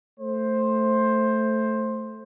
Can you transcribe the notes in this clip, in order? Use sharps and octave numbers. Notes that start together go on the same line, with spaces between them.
A3 C5